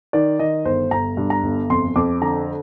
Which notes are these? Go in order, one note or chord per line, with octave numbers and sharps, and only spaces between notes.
D#3 D5
D#3 D#5
G1 C5
G1 A#5
G2
A#5
G1
F2 C6
F2 D6
D3 A#5